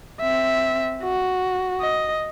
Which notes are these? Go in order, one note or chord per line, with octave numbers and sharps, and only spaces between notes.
C4 E5
F#4
D#5